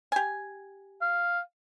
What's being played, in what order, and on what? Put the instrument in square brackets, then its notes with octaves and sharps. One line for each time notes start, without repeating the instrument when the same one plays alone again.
[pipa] G4 G#5
[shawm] F5